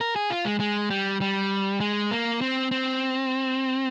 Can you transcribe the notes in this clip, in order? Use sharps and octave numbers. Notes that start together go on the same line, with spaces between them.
A#4
G#4
F4
G#3
G#3
G3
G3
G#3
A#3
C4
C4